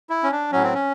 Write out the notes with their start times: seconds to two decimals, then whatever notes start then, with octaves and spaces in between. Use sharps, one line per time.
0.10 E4
0.23 C#4
0.32 D4
0.52 A2 F#3 C#4
0.63 C4
0.74 C#4